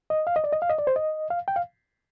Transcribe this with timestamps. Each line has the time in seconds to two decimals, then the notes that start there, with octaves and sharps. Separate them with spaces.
0.10 D#5
0.27 F5
0.36 D#5
0.44 D5
0.53 D#5
0.62 F5
0.70 D#5
0.79 D5
0.87 C5
0.96 D#5
1.30 F5
1.48 G5
1.56 F5